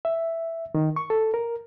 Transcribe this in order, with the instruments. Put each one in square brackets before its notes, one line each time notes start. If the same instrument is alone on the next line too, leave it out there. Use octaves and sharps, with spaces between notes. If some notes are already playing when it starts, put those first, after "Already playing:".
[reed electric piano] E5
D#3
C#6
A4
A#4